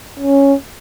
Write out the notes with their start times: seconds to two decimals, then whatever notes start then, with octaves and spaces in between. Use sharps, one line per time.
0.19 C#4